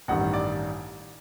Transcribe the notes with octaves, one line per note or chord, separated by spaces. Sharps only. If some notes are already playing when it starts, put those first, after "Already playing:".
A1 G2 D#3 G3 F#5
D5